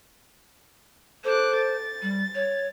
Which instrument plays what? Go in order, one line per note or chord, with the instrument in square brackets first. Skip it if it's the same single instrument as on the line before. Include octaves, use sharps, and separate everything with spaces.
[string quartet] A4 D6 F#6 [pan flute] C5
[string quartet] A6
[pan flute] G3
C#5